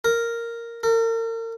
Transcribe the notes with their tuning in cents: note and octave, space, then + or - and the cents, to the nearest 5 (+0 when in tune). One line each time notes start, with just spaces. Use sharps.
A#4 -5
A#4 -40